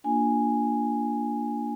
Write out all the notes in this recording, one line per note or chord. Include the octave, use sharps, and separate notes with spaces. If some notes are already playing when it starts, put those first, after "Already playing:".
A#3 D4 F4 G#5